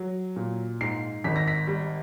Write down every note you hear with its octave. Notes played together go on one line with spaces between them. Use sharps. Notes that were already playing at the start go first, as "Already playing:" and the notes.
Already playing: F#3
A#2
G#2 C7
G#1 B6
A#6
B6
G3